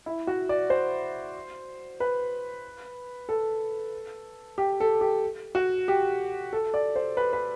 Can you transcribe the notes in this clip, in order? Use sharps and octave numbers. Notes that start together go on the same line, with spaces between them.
E4
F#4
D5
C5
B4
A4
G4
A4
G4
F#4
G4
A4
D5
C5
B4
B4